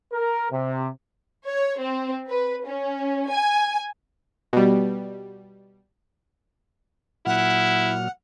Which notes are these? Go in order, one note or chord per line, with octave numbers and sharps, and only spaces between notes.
A#4
C3
C#5
C4
B4
C#4
G#5
B2 G3
A#2 F#3 E4 F#5 F6